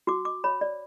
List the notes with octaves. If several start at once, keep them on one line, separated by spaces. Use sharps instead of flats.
F#4 D6
D6
C#5 B5
D5